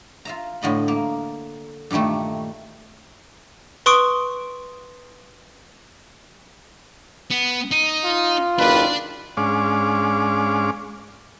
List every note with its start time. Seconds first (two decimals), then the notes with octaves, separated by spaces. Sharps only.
0.25 F4 E5 A#5
0.62 A2 D3 D#5 B5
0.88 A#3
1.90 G2 A#2 D#3 G3 A3
3.86 B4 C6 C#6 D#6 D7
7.31 B3
7.71 D#4
8.04 F4
8.58 F#1 D#2 D4 B4 D5
9.37 G#2 G#3 C#4 D4 F5 D6